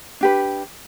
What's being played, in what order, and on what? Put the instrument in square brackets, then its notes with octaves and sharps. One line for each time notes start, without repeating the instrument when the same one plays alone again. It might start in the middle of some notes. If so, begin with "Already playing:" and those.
[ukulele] D4 G4 B4